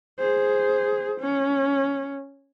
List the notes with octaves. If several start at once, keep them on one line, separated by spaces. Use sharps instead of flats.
G#4 C5
C#4